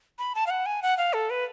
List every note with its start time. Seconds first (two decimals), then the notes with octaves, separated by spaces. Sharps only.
0.19 B5
0.35 A5
0.47 F5
0.50 F#5
0.66 G#5
0.82 F#5
0.98 F5
1.13 A4
1.30 B4